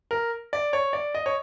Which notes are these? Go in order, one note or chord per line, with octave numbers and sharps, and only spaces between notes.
A#4
D5
C#5
D5
D#5
C#5